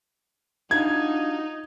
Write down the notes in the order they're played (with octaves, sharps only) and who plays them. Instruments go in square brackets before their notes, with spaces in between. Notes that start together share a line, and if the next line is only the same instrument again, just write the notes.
[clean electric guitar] D4 F4 F#4 [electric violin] D#4 [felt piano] G#6